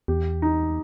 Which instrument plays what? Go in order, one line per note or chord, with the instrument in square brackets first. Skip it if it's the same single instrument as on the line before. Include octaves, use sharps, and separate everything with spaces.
[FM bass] E2 [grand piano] G4
[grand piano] D#4